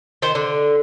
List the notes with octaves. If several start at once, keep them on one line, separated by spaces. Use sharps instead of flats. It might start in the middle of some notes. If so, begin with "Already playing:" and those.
D#3 C5
D3